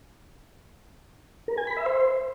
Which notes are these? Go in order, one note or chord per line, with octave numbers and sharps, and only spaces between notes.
A#4
G#5
B5
E5
C5